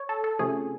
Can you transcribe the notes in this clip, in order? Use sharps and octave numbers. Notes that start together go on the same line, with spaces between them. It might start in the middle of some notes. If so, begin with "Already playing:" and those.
Already playing: C#5
A4
A4
C3 F3 A3 C#4 G#4